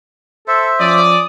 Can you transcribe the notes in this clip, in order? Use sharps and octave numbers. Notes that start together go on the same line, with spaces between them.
A4 C5 E5
F3 C#4 D5 D#6